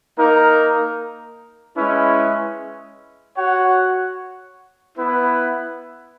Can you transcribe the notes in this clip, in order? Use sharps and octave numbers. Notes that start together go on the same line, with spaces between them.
A#3 D#4 A#4
G#3 C#4 E4 B4
F#4 C#5 F#5
B3 E4 B4